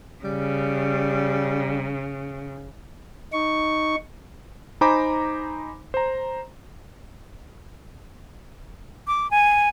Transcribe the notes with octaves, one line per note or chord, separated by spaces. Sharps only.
C#3 G3
D#4 C#6
D#4 C5 G#5 A#5 B5 D6
C5 A#5
D6
G#5